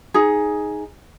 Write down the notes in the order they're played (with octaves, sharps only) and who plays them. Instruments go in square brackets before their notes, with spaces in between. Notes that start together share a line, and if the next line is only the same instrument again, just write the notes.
[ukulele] D#4 G#4